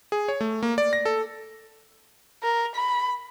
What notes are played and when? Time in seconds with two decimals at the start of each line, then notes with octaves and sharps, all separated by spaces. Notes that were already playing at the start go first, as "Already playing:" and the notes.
0.12 G#4
0.28 C#5
0.41 A3
0.63 A#3
0.78 D5
0.93 A#6
1.05 A4
2.43 A#4
2.75 B5